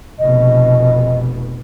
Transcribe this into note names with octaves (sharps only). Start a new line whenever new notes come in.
F1 B2 D#5